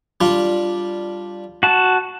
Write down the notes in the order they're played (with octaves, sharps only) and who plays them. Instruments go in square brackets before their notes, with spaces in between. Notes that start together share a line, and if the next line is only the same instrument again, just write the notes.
[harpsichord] G3 D4 F4
[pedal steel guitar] F#4 A5